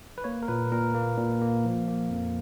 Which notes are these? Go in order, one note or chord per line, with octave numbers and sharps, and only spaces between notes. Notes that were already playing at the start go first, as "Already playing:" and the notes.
B4
A#3 C#5
A#4
A#2 B4
A#2 A#4
A#3
A#2
A#3
F3
A#3
F2